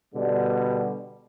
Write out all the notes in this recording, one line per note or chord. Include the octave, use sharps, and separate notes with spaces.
B2 D3 G3